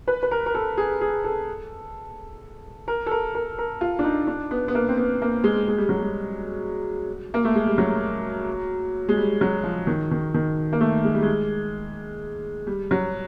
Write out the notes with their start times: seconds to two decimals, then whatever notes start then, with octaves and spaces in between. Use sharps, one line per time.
0.08 B4
0.23 B4
0.31 A#4
0.46 A#4
0.55 A4
0.77 G#4
1.01 G#4
1.24 A4
2.88 A#4
3.06 A4
3.11 A#4
3.35 A#4
3.58 A#4
3.81 F4
3.99 D4
4.04 D#4
4.27 D4
4.51 B3
4.68 B3
4.75 A#3
4.88 C4
4.97 B3
5.22 A#3
5.44 G#3
5.68 G#3
5.78 G3
5.89 F#3
6.00 G3
7.34 A#3
7.45 A3
7.56 G#3
7.67 G3
7.78 F#3
9.09 G#3
9.17 G3
9.41 F#3
9.63 F3
9.87 D#3
10.11 D#3
10.34 D#3
10.73 A#3
10.81 A3
11.05 G#3
11.14 G3
11.22 G#3
12.67 G3
12.91 F#3